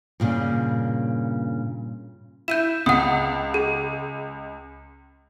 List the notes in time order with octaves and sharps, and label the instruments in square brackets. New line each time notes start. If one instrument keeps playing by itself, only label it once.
[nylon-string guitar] G2 A#2 C#3
[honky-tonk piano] E4 [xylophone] G6 D#7 E7
[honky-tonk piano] C#2 [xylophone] F#5 D#6
[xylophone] G#4